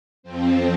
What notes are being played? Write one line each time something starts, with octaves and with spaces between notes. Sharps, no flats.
F2 F3 C4